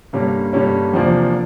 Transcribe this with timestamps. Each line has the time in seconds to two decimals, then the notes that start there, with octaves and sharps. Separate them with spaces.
0.13 G2 D3 G3 A#3 C#4
0.53 G2 D3 G3 A#3 C#4
0.94 E2 C3 F3 A#3 D4